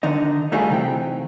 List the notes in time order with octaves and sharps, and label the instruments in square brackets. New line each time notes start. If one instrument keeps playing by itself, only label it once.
[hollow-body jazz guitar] D3 D#3 D#4 D#5
F#3 G3 A3 D#4 F4 G#4
C3 E3 G5